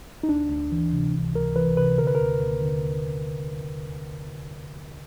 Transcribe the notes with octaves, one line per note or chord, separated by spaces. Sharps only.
D#4
D2 D4
D2
E3
C3
C#2
C#2 A#4
E3 B4
C3 B4
D3 A#4
B4
D#2 A#4
D#2
D3